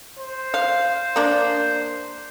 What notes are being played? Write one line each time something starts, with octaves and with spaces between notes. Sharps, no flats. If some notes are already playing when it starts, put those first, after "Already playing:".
C5
F5
A#3 D4